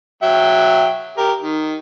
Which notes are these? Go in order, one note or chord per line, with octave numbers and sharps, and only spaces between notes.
F#3 E5 G5
G4 A#4
D#3